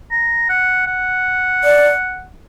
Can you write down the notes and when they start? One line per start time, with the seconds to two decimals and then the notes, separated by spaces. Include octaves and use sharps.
0.11 A#5
0.49 F#5
0.87 F#5
1.64 D5